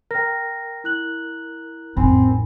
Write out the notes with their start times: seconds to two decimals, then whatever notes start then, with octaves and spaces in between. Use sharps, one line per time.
0.11 A#4 G5 A#6
0.84 E4 F#6 F#7
1.97 A1 F2 C4 D#4 G#5 B5